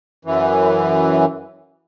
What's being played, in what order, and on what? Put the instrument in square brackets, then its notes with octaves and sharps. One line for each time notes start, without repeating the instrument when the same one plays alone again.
[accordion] F#2 E3